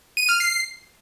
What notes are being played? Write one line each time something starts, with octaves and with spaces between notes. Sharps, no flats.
D#7
F6
C7